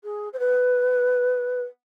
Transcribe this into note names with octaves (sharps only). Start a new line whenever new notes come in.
G#4
C5
B4